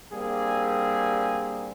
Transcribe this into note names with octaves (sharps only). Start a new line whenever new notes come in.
G3 A#3 C4 D4 G#4